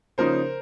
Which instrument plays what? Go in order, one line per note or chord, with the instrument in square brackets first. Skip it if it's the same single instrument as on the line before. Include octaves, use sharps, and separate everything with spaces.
[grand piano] C#3 F3 A#3 D#4 A#4 C5